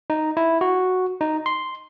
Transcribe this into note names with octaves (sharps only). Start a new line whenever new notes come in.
D#4
E4
F#4
D#4
C6